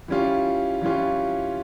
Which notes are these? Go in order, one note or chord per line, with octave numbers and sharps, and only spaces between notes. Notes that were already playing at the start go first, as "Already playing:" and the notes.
E3 G3 C#4 F4
E3 G3 C#4 F4